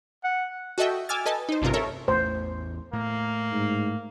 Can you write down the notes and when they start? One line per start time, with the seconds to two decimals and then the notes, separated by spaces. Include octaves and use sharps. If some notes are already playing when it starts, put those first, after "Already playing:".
0.24 F#5
0.78 F#4 A4 D#5 E5 G5
1.09 G#5 D6 E6 F6 A6
1.26 A4 B4 D#5 G#5 A5
1.49 D#4 C5
1.62 A1 G2 C3 F4 A#4
1.74 A4 A#4 C#5 E5
2.08 A1 E2 A3 C5
2.93 A2 A#3
3.52 G#2